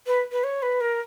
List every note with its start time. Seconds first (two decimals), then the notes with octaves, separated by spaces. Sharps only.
0.07 B4
0.32 B4
0.44 C#5
0.62 B4
0.80 A#4